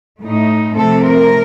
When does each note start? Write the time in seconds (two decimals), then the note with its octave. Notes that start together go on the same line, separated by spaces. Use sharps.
0.21 A2 A3 D#4
0.77 C3 F3 A3 C4 A4
1.05 A#4